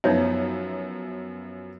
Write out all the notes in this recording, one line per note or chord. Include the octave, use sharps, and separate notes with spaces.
F#2 F3 B3 D#4 C#5 E5